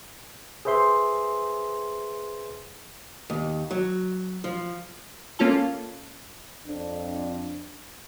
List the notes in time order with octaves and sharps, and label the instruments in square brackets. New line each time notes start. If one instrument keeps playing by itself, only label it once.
[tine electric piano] G#4 B4 C5 E5 C6
[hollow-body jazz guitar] D#2
F#3
F3
[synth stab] A#3 C#4 F4 A4
[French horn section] F2 D4